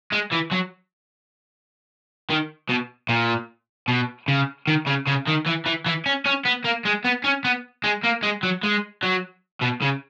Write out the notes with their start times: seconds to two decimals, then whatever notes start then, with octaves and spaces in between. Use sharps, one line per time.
0.12 G#3
0.32 E3
0.51 F#3
2.30 D#3
2.69 B2
3.09 A#2
3.88 B2
4.28 C#3
4.67 D#3
4.87 C#3
5.07 C#3
5.27 D#3
5.46 E3
5.66 E3
5.86 E3
6.06 C#4
6.26 C#4
6.46 B3
6.65 A#3
6.86 G#3
7.05 B3
7.24 C#4
7.45 B3
7.84 G#3
8.04 A#3
8.23 G#3
8.43 F#3
8.63 G#3
9.03 F#3
9.62 B2
9.82 C#3